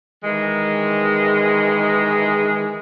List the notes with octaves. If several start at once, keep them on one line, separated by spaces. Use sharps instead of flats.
D#3 E3 G#3